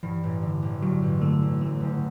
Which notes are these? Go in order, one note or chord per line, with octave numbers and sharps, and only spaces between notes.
G2 E3
A1
D3
A1
G2 F#3
A1
D3 A3
A1
F#2 A3
F#1